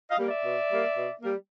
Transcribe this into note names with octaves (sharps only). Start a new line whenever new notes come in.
D#5 F5
G3 A#3
D5 E5
B2
G3 A#3
B2
G3 A#3